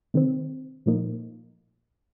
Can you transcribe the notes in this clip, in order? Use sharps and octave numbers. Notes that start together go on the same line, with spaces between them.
C3 D#3 C4
A#2 F3 A#3 D#4